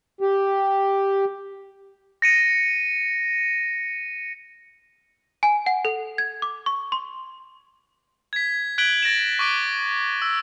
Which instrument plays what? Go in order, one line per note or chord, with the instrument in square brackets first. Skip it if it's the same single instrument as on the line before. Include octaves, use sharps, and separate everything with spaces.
[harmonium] G4
[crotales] A#6 C#7 D#7
[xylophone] G#5
F#5
A4
G#6
D6
C#6
C6
[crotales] G#6 B6
F#6 G#6 B6 D7 F#7 G7
A6 A#6 D7 E7
C#6 D6 D7 G7
E6